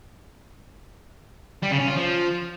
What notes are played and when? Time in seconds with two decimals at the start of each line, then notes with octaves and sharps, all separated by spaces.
1.63 G3
1.71 C#3
1.80 C#4
1.88 F4
1.96 F3